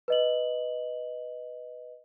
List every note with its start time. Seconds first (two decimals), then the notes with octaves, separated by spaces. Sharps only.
0.08 B4 D#5 F#7